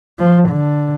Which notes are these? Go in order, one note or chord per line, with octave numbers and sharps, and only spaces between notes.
F3
D3